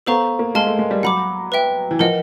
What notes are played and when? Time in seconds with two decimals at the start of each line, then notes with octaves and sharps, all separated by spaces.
0.06 B3 A4 C5 F5 A#5 C#6
0.39 A#3
0.55 G#3 F5 A5 C6 F6
0.67 A3
0.79 G#3
0.91 G3
1.03 F#3 F#5 B5 D6
1.52 B4 E5 G5
1.91 E3
1.99 F3 A#4 D#5 F#5